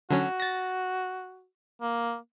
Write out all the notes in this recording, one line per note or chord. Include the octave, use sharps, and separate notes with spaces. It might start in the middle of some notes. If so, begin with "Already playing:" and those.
D3 F#3 C#4 F#4
A6 A#6
A#3